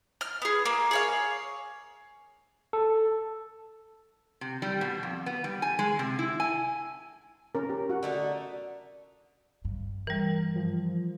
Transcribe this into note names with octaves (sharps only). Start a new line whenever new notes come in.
F6
B3 G#4
A#3
G#4 C#5 F5
A4
C3
G3
B2
F2
B3
G3
G#5
G#3
C3
E4
G#5
C#4 A#4
G4
F#4 F#5
D3 A3 D#4
G2
E3 G3 A#4
F3